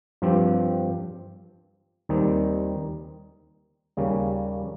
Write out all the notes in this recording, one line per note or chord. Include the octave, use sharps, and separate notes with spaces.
G2 F3 C4 G4
D#2 D#3 G3 C4 D#4
D#2 C#3 G3 A#3 C#4